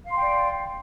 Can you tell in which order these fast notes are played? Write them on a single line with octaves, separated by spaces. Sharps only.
F5 C6 G5 D5